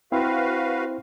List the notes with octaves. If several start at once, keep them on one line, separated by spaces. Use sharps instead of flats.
C4 E4 F#4 B4 C5 F5